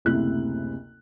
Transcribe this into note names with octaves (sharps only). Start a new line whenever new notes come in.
F#1 D2 C3 E4 F#6